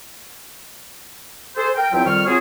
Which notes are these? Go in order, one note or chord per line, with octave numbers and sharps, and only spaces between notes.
G#4 A4 C5
A#4 G5
E2 F#3 C4 F4 E5 G5
F2 D#3 G3 C#6 F6
F#3 C4 F4 F#4 G#4